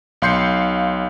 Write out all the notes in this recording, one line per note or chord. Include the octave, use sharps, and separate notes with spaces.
B1 F5 C6 G6 C7 C#7